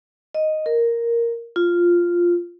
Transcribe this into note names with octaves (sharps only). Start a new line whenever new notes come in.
D#5
A#4
F4